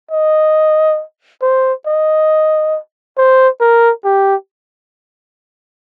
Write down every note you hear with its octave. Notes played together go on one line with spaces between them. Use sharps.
D#5
C5
D#5
C5
A#4
G4